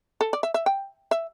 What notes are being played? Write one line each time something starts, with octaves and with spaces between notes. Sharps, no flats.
A4
D5
E5
E5
G5
E5